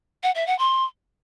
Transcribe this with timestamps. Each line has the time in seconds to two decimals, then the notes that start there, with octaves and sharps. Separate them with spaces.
0.23 F#5
0.35 E5
0.47 F#5
0.59 C6